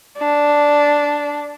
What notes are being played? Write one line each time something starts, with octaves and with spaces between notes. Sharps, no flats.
D4